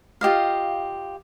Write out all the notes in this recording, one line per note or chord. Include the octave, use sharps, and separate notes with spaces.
F4 G4 D#5 F5